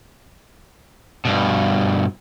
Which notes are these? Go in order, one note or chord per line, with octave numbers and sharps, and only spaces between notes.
G2 B2